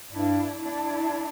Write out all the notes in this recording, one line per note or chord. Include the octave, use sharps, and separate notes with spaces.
G2 D4 E4
D4 E4